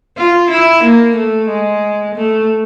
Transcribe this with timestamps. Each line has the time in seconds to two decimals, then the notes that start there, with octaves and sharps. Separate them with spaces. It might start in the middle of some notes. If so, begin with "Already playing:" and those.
0.17 F4
0.50 E4
0.84 A#3
1.16 A3
1.49 G#3
2.15 A3